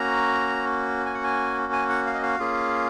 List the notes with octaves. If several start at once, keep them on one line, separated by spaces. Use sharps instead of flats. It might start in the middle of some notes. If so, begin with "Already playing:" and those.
Already playing: A#3 C#4 F#4 A#5
G#5
F#5
G#5
G#5
F#5
F5
D#5
F5
A#3 C#4 F4 G#4